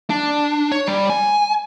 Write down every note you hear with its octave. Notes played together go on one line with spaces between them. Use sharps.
D4
C#5
G3
G#5